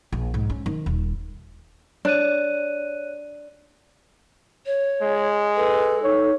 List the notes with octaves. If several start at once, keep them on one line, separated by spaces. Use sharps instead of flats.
A#1
G#2
C#4
D#3
D#1
D4 C#5 F#6 D#7
C#5
G#3
A4 B4
D#4 C#5